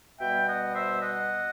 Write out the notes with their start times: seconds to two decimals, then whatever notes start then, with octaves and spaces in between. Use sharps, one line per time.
0.20 B2 G3 B3 E5 G5
0.47 D#5 F#5
0.74 C5 E5
1.01 D#5 F#5